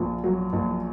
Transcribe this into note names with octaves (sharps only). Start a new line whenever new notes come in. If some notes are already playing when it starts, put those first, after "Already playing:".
Already playing: A#1 A#2
F#3
A#1